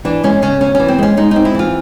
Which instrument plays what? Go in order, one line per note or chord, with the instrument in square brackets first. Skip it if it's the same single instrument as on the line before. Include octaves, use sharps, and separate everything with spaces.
[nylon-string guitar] E3 D4
G#3 C#4
C#3 C#4
D2 C#4
E3 C#4
C4
G#3 C#4
G#3 D#4
C4 D#4
E4
E3 F4